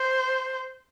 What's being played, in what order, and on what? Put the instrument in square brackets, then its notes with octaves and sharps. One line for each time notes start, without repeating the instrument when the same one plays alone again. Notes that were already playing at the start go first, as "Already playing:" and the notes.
Already playing: [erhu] C5